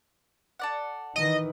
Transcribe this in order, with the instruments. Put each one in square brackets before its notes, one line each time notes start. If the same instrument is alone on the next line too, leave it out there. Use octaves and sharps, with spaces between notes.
[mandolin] A4 D5 F#5
[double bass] D#3 E3 [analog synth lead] D#5